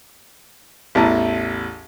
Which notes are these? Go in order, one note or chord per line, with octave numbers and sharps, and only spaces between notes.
A1 E2 E4 A5 A#5